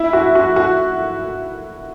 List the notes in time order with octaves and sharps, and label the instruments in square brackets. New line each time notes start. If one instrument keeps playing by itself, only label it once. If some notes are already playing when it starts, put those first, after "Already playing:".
Already playing: [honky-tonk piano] E4
F#4
F#4
F#4